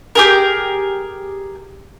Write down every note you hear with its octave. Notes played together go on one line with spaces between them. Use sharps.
G4 G#4 A#4